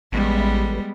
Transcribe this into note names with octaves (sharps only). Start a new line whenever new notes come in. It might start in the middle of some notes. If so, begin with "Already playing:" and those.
A1 G3 G#3 B3